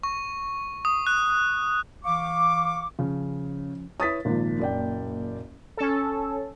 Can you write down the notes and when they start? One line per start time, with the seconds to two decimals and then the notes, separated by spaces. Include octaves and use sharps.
0.03 C#6
0.85 D#6
1.07 F#6
2.04 E3 F5 C#6 D6
2.99 C#3 F3 C#4
4.00 E4 B4 C#5 D#6 A6 B6
4.25 G#1 A#2 F3 A#3
4.59 F#1 D5 G5
5.77 C#4 A4